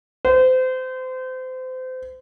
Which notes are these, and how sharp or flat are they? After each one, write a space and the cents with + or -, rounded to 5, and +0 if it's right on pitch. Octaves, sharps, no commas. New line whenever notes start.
C5 -30